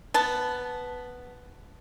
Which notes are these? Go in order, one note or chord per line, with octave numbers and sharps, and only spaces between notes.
B3 A5